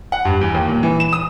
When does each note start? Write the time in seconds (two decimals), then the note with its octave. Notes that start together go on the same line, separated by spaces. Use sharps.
0.12 F#5
0.25 G2
0.41 E2
0.54 D#2
0.68 A#2
0.83 E3
1.00 E7
1.13 D#6